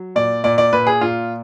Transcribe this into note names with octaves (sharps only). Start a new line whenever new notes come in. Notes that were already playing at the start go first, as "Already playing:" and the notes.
Already playing: F#3
A#2 D5
A#2 D5
D5
A#2 B4
G#4
A#2 F4